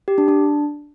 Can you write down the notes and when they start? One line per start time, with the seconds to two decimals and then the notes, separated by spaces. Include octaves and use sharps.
0.08 G4
0.18 D4
0.28 D4